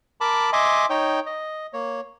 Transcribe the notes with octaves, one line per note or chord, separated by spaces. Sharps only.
A#4 A5 B5 D6
D#5 E5 G#5 C6 D6
D#4 C#5 G5
D#5
A#3 C#5